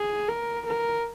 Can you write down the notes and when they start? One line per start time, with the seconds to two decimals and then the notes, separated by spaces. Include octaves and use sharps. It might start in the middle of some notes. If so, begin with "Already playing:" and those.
Already playing: G#4
0.28 A#4
0.66 A#4